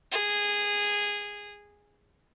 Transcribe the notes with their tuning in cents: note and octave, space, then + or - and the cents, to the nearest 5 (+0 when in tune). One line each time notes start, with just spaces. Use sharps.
G#4 -15